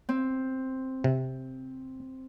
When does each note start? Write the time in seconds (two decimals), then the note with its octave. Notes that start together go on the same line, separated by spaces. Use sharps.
0.09 C4
1.04 C3